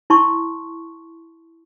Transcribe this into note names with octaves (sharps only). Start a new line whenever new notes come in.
E4 A5 C6 C#6